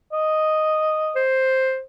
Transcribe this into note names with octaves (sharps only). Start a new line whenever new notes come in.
D#5
C5